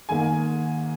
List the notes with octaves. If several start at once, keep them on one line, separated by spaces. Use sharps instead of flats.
G#2 D#3 A#3 G#5